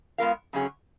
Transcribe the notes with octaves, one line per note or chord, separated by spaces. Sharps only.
G#3 B3 F4 A#4 F5
F#2 C#3 F#3 C#4 G#4